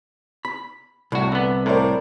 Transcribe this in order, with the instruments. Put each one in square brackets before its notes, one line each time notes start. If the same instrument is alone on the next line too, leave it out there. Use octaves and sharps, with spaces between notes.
[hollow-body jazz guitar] B5
[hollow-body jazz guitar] C2 [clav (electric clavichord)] A2 F#4
[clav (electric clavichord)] D3 B3
[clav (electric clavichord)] A2 [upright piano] A#4 C5 D5